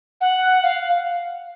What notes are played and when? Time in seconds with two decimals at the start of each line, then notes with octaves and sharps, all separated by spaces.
0.21 F#5
0.63 F5